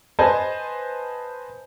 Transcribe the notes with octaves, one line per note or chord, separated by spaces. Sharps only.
B4 C5 D#5 G#5 A5